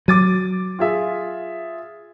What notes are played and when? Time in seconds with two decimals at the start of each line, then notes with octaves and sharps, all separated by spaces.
0.08 F#3 D6 A6 D#7
0.79 F4 G#4 E5